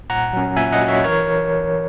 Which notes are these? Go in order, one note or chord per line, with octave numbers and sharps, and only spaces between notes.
A#2 F#5 A#5
F#3 C#4
A#2 E5 G#5
D#5 F#5
F#3 C#4
C#5 E5
E3 A#4 C#5